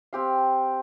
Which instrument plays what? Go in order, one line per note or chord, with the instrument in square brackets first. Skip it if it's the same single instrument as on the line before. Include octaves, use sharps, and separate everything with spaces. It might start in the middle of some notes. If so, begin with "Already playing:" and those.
[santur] C4 G4 F5